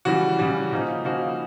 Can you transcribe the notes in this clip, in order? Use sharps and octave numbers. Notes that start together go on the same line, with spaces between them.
C#3 E3 G3 F#4
C#3 E3 G3
C#3 F3 A#3 D#4
C#3 F3 A#3 D#4 F#4